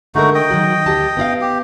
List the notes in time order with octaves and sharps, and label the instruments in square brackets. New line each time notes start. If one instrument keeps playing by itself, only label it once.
[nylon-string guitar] D3 G#3 A#4 [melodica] A3 D#4 F#4
[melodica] D#5 G5
[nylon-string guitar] D#3 F#3 F#4
D2 G4 A5
B3 E4 F5
[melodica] G4